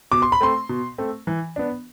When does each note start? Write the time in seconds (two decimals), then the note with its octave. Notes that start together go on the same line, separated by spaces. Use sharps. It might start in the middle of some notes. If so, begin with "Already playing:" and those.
0.12 B2 D6
0.22 C6
0.32 B5
0.41 A3 C4 C6
0.69 B2
0.98 A3 C4
1.27 E3
1.56 B3 D4